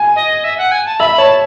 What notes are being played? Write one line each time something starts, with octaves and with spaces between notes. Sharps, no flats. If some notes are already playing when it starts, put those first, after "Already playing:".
Already playing: G#5
D#5
E5
F#5
G#5
A5
E5 B5
C#5 A5